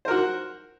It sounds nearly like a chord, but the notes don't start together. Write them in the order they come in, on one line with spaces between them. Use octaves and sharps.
C5 A#4 F#4